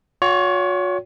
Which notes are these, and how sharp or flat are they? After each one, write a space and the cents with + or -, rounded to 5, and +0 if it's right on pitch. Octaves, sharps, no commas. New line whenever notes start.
F#4 -45 C#5 +30 G5 +0